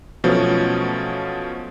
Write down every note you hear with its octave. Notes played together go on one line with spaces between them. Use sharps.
B2 F3 F#3 A3 C#4